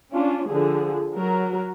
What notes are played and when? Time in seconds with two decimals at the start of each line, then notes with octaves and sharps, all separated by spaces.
0.12 C#4 D4 F4
0.48 D3 F3 G#4
1.13 F#3 A#4